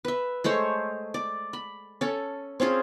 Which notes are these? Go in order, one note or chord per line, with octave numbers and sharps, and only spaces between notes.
B4 E5
G#3 A3 C5 C#5
D5
B5
C#4 A4
C4 C#4 F4 G#4